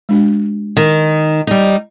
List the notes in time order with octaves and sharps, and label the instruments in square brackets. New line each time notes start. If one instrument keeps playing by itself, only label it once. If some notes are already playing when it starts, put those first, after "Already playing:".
[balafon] G#3 D4 F#4
[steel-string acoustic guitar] D#3
G3 D#4